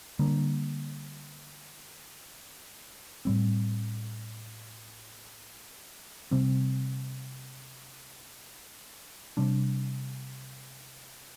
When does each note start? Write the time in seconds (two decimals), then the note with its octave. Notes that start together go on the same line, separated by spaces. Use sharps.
0.19 D3 G3 A#3 D4
3.25 A2 G3 C4
6.31 C3 G3 C4
9.37 C3 G3 D4